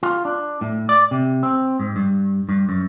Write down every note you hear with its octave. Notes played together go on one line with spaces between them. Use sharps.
F4
D4
A2
D5
C3
C4
G#2
G2
G2
F#2